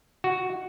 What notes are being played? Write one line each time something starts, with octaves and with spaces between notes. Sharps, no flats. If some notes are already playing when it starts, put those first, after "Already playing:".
F#4